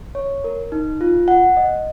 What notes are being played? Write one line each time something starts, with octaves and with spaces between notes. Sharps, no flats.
C#5
A#4
D#4
F4
F#5
D#5